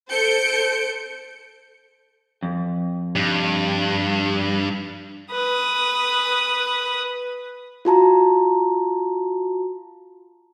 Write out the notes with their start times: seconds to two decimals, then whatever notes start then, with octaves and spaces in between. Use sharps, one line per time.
0.10 A4 C5 G6 C#7 D7
2.43 F2
3.16 G2
5.31 B4 D#6
7.85 F4 F#4 A5 A#5